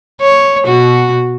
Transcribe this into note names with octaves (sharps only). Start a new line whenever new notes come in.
C#5
B2 F#4